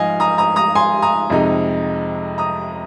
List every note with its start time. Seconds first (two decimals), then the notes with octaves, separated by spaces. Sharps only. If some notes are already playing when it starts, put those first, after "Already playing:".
Already playing: G#2 F3 D#5 F5 G#5
0.20 A#5 D#6
0.38 A#5 D#6
0.56 A#5 D#6
0.75 G#5 C6
1.02 A#5 D#6
1.30 F2 C3 G#3 D#4
2.38 A#5 D#6